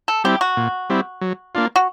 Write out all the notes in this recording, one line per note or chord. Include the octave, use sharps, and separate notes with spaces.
A4
G3 C4 E4 G4
F#4
A#2
G3 C4 E4
F#3
A#3 D4 F4
F#4